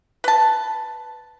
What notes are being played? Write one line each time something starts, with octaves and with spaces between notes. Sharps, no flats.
B4 A5